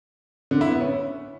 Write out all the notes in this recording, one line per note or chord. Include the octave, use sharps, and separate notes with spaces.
D3
E4
B3
C#4